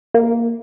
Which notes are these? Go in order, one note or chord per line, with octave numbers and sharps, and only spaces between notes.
A#3